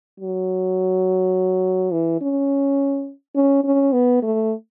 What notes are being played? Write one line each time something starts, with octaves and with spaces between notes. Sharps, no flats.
F#3
E3
C#4
C#4
C#4
B3
A3